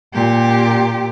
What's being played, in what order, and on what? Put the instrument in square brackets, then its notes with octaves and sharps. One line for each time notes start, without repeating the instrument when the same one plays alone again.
[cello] A#2 G4